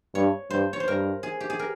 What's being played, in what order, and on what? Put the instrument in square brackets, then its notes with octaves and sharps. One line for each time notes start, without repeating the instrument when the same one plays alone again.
[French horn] G2 [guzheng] C#5
[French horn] G2 [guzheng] C5
[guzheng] C#5
C5
[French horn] G2 [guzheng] A#4
[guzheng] G#4
G4
G#4
A#4